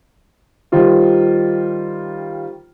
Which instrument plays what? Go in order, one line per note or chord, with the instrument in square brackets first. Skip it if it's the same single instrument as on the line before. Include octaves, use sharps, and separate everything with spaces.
[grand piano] D#3 G3 F4 C5